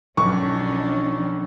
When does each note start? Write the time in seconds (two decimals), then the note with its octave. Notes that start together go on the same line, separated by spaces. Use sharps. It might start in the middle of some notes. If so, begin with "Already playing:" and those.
0.17 B1 D#3 F3 C#4 D4 C#6